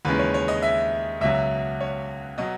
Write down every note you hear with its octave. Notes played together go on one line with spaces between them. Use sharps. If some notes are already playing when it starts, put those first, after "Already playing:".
D#2 C#3 E3 G#3 B4
C#5
C#5
D#5
E5
C#2 B2 F#3 E5
C#5
B2 F#3 D#5